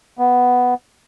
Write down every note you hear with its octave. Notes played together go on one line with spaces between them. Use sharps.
B3